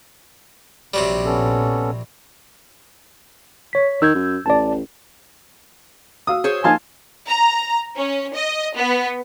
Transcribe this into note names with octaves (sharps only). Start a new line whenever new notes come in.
A#1 C3 F#3 G3
B3 C#4 A4
C#5 B6
D#3 E6 G6 G#6
F#2
A1 D5 A5
F#4 F5 D#6 E6
G#4 C5 C#5
F3 A#3 D#4 F5 G#5 A5 C6
A#5
C#4
D#5
B3